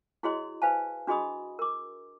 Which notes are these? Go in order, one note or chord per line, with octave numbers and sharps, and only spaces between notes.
E4 F#4 G#4 C#5 D#5 C6
B4 C5 F5 G#5 A5
D4 F#4 G#4 D#5 B5 D#6
A#4 D6